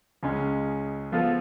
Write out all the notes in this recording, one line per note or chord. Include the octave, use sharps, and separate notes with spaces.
C#2 C#3 G#3 C#4
F3 B3 F4 A4